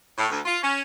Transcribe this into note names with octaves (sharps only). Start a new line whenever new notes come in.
A2
D2
F4
C#4